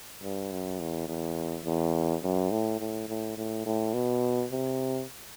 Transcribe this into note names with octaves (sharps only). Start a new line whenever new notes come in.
G2
F#2
E2
E2
E2
F#2
A2
A2
A2
A2
A2
B2
C3